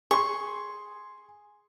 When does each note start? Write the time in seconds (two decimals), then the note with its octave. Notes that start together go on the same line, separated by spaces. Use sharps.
0.11 G#4 C6 C#6